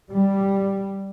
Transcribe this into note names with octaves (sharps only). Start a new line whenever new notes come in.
G3